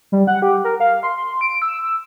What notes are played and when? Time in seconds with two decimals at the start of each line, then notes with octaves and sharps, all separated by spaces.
0.12 G3
0.27 F#5
0.42 G4
0.64 A#4
0.80 F5
1.03 C6
1.41 D7
1.62 E6